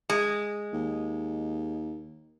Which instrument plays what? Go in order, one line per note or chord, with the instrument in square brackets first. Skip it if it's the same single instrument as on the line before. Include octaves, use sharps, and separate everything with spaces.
[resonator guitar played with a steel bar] G#3
[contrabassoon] D#2